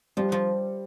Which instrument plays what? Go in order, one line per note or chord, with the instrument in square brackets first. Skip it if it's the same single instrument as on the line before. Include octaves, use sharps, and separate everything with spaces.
[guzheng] F3 [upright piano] G3
[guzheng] F3